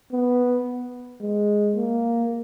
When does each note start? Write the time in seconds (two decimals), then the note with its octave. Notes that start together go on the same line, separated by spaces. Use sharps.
0.12 B3
1.21 G#3
1.76 A#3